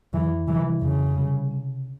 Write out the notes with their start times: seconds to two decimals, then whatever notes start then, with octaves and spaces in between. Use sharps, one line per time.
0.13 F2 E3
0.47 C3 E3 G3
0.82 F2 C#3
1.16 C3 G3
1.51 C3